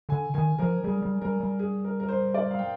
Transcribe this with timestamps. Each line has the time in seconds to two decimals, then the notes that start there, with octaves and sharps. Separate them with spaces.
0.09 D3 G#5
0.34 D#3 G#5
0.58 F3 A#4
0.84 G3 G#4
1.02 G3
1.22 G3 A#4
1.40 G3
1.59 G#4
1.84 A#4
2.00 A#4
2.09 C5
2.34 D5
2.51 F5
2.59 G5